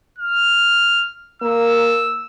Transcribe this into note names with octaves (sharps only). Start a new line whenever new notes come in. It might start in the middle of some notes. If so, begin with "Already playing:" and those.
F6
A#3 E6